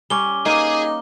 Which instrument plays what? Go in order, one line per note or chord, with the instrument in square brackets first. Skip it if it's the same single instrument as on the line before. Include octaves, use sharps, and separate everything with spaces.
[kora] G3 C#4 [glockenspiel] D6 G7
[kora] A#3 [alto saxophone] D#4 [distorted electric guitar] G#4 G#5